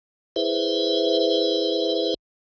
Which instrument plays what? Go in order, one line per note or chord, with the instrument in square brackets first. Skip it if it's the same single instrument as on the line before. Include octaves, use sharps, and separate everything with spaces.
[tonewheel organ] E4 G#4 B4 C5 E5